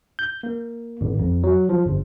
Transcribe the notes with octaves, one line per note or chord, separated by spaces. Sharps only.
G6
A#3
G#1
F2
F#3
F3
G1